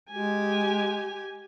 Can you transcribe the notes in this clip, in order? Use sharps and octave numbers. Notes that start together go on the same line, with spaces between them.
G#3 G4 G#5